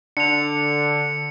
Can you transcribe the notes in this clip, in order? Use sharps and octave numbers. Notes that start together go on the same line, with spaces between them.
D3 C#7 F7